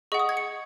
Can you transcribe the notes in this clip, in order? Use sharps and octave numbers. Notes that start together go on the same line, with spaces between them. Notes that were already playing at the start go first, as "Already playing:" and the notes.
G#4 D#5 F#5 C#6
D#6
G#6
C#7